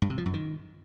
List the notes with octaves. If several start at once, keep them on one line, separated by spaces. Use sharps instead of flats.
G2
C3
F3
F#2
D#3